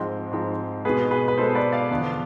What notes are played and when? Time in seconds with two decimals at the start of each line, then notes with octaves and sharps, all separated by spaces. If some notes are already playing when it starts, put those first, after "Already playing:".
Already playing: G#2 F3 G#3 C4
0.31 G#2 F3 G#3 C4
0.85 B2 G#3 B3 G#4 B4
1.11 G#4 B4
1.28 B4
1.38 B2 G#3 B3 A4 C5
1.55 B4 D5
1.72 D5 F5
1.91 E2 D3 F3 B3 D4